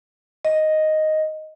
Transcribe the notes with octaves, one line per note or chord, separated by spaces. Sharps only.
D#5